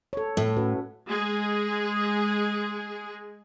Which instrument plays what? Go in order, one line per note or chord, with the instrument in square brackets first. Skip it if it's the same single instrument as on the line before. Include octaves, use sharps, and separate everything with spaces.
[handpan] A4 C#5
[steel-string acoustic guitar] A2
[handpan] C#4 F#4 B4
[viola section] G#3 G#4